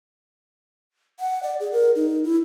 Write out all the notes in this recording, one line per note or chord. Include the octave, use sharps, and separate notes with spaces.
F#5
D5
G#4
A#4
D#4
E4